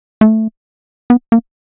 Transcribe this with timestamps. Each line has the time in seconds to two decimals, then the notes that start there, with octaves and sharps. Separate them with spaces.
0.21 A3
1.10 B3
1.32 A#3